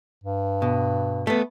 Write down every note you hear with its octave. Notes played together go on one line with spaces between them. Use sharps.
G2
B2
A3 B3